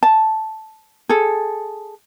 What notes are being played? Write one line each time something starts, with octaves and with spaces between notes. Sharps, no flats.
A5
G#4 A4